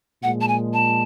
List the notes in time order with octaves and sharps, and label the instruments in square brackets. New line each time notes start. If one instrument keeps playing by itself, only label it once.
[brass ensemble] A#2 F3 G#3 [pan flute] F#5
[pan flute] A5
G#5
A5